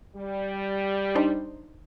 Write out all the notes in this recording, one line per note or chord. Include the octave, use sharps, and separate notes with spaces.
G3
D4 D#4 C5